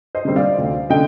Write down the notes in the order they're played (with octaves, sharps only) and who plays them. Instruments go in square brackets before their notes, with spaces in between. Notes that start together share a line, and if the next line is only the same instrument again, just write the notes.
[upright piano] C5 D#5
D3 G3 C4
D5 F5
D2
D3 D#5 G5